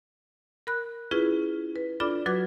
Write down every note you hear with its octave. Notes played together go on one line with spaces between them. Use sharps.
A#4 B5 F#6
C#4 E4 F4 G#4 B4
B4
D4 F4 A4 D5 B5 D6
F#3 F#4 B4 D6 G#6 A6